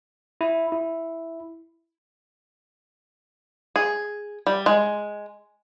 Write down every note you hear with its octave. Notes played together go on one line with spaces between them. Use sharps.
E4
E4
G#4
G3
G#3